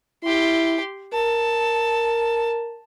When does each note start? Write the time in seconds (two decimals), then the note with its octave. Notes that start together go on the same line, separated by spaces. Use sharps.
0.24 E4 G4 C6
1.13 A#4 A5